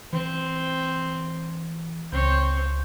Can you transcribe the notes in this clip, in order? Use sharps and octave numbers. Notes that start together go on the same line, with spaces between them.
E3 C4
C#2 C4 C#5 G6